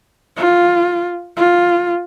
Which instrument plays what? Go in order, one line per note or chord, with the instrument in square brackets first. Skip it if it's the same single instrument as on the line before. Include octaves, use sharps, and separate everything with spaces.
[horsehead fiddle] F4
F4